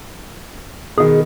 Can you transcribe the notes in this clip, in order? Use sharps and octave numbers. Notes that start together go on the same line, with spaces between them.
B2 D#3 G#4